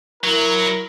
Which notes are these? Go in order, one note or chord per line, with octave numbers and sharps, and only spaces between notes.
F#3 E4 A#4